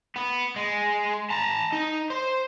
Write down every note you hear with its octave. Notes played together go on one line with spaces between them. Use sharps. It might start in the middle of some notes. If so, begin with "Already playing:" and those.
B3
G#3
A5 A#5
D#4
C5